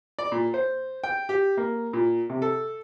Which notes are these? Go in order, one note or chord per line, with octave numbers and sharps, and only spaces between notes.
D5
A#2
C5
G5
G4
A#3
A#2
C3
A4